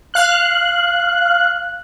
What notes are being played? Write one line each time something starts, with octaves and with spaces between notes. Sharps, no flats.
F5 F#6